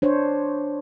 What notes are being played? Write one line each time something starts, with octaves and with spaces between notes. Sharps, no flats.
D4 C5 C#5